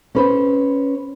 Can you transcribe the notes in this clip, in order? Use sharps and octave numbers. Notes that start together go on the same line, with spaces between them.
C#4 B4 C5